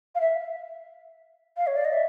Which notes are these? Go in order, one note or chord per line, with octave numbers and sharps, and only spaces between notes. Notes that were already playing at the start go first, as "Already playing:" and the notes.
F5
E5
F5
C#5
D5
D#5
E5